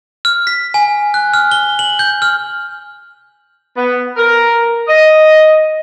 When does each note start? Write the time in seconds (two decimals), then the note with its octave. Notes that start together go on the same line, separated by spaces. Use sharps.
0.25 F6
0.47 B6
0.74 G#5
1.14 F#6
1.34 F6
1.51 G7
1.79 F#7
1.99 G6
2.22 F6
3.76 B3
4.17 A#4
4.88 D#5